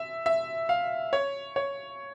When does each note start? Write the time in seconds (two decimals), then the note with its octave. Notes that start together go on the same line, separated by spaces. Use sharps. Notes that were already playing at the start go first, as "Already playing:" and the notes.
Already playing: E5
0.26 E5
0.69 F5
1.13 C#5
1.56 C#5